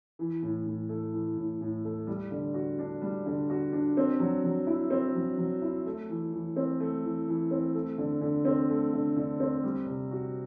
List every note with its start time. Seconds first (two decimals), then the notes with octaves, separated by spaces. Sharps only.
0.19 E3
0.42 A2
0.66 A2
0.89 A3
1.13 E3
1.37 A2
1.61 A2
1.84 A3
2.07 G3
2.31 D3
2.54 F#4
2.79 D4
3.01 G3
3.26 D3
3.49 F#4
3.72 D4
3.97 C4
4.20 F#3
4.44 F#3
4.67 E4
4.90 C4
5.15 F#3
5.38 F#3
5.62 E4
5.86 A3
6.09 E3
6.33 E3
6.56 C4
6.80 A3
7.04 E3
7.28 E3
7.51 C4
7.75 A3
7.98 D3
8.21 D3
8.45 C4
8.69 A3
8.93 D3
9.16 D3
9.40 C4
9.63 G3
9.87 C3
10.11 F#4